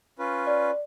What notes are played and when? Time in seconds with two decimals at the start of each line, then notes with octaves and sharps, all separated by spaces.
0.19 C#4 F4 B4
0.47 D5